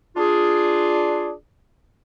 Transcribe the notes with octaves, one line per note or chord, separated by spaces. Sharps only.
D4 F4 G#4